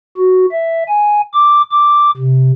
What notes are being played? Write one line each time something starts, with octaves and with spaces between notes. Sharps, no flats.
F#4
E5
G#5
D6
D6
C3